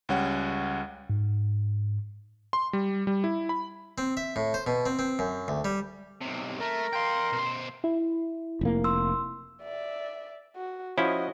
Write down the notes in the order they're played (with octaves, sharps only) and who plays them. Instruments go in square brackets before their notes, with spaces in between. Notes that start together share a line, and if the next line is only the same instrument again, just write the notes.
[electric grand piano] C#2 G3 C#4 F#5
[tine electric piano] G#2
[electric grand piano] C6
G3
G3
E4
B5
[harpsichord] C4
E5
A2
C5
B2
C4
C4
F#2
D2
G3
[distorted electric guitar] B1 C3
[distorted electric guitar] A3 [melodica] A#4
[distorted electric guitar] F5 G5 [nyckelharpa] C6
[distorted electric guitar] B2 C5
[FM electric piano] E4
[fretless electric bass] F1 A#3
[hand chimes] C6 E6
[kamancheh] D5 E5
F#4
[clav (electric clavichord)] F3 C#4 E4 [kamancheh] F#4 D#5